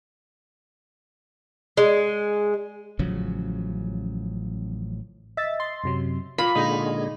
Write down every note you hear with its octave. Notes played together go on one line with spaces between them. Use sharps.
G#3
A1 C#3 F3 F#3
D#5 E5 A6
C6
F#2 C3 F#3
A#2 F4 B5
A#2 D3 G#3 D#4